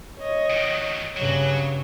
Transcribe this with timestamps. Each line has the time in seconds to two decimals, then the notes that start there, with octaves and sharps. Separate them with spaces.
0.19 C#5 D#5
0.50 D#3 F#3
1.17 G2 C#3 F#3 C#5